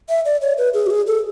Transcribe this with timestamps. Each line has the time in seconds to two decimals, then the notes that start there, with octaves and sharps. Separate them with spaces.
0.09 E5
0.25 D5
0.41 C#5
0.58 B4
0.74 G#4
0.86 F#4
0.90 G#4
1.07 A4